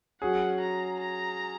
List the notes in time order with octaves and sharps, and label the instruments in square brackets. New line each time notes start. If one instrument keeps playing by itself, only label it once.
[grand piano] F#3 C#4 G#4 [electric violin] F#5
[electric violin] A#5
A#5